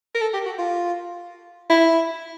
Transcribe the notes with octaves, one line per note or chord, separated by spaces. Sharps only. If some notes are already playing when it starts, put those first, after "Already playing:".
A#4
A4
G4
F#4
F4
E4